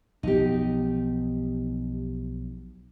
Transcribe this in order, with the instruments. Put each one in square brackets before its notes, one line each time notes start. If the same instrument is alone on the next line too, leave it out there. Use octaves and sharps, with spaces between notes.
[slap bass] B1 F3 B3 [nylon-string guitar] D#4 G4